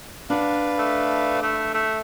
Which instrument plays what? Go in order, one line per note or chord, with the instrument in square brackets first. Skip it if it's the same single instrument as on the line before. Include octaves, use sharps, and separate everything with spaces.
[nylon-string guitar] D4 F#5 [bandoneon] B4 D5 F5
[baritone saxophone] A3
A3
A3